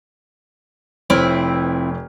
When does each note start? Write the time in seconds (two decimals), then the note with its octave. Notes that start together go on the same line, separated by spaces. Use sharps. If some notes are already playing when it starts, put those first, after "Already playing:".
1.10 F1 C4 E4 B4 C#5 F6